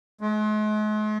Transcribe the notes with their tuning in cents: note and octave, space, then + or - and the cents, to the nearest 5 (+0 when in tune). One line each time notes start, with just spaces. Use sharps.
G#3 +45